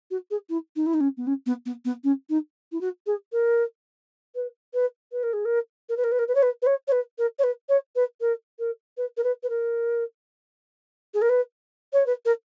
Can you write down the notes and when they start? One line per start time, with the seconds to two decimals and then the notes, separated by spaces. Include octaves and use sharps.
0.11 F#4
0.31 G#4
0.50 E4
0.76 D#4
0.86 E4
0.94 D#4
1.01 C#4
1.17 B3
1.27 C#4
1.46 B3
1.66 B3
1.85 B3
2.04 C#4
2.30 D#4
2.72 E4
2.81 F#4
3.07 G#4
3.32 A#4
4.35 B4
4.74 B4
5.12 B4
5.23 A#4
5.33 G#4
5.45 A#4
5.89 A#4
5.97 B4
6.04 A#4
6.12 B4
6.19 A#4
6.28 B4
6.35 C#5
6.43 B4
6.62 B4
6.67 C#5
6.88 C#5
6.92 B4
7.18 A#4
7.39 C#5
7.44 B4
7.69 C#5
7.96 B4
8.21 A#4
8.59 A#4
8.97 B4
9.17 A#4
9.24 B4
9.43 B4
9.50 A#4
11.14 G#4
11.22 A#4
11.29 B4
11.93 C#5
12.06 B4
12.25 A#4